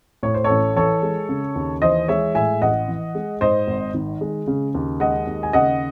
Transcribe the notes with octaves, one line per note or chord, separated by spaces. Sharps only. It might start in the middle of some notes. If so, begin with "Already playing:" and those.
A2 C#5
C5
A1 A4 C#5
E3 A4 C#5
G#3
C#3
D#2
E3 C5 D#5
G#3 C#5 E5
A2 E5 G#5
A1 D#5 F#5
E3
G#3
G#2 C5 D#5
G#1
D#3
G#3
C#3
D#2
G#3 D#5 F#5
D#2
G#5
C#3 D#5 F#5